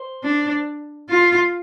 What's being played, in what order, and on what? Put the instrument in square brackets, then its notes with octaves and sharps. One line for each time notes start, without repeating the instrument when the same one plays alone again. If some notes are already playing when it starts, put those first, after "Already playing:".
Already playing: [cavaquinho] C5
[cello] D4
F4